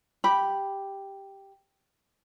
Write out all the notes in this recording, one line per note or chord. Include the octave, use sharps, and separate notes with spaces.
G4 B5